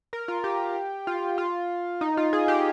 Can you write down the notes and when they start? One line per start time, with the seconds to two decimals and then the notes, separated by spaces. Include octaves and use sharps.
0.13 A#4
0.28 F4
0.44 G4
1.07 F4
1.38 F4
2.01 D#4
2.17 F4
2.33 G#4
2.48 G4